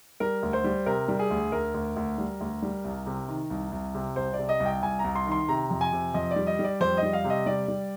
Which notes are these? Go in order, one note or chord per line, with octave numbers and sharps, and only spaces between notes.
G3 A#4
D2
C5
G3
C3 A#4
G3
G#4
D2
D2 A#4
D2
D2
G3
D2
G3
C2
C3
D#3
C2
C2
C3
C2 C5
D5
C3
D#5
C2
G5
C2 G#5
A#5
C2
C6
D#3
C6
C3 A#5
F2
G#5
C3
F2 D#5
D5
G3
D#5
G3
D5
F2 C5
D#5
G3
F5
C3
D#5
G3 D5
G3